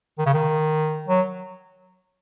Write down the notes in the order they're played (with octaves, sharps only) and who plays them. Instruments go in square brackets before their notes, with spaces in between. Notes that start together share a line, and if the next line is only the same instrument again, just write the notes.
[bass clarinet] D#3
C#3
D#3
F#3